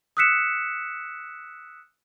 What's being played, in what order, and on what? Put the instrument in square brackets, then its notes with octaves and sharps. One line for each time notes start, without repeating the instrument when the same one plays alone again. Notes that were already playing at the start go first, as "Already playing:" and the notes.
[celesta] D#6 E6 F#6 B6 C#7 E7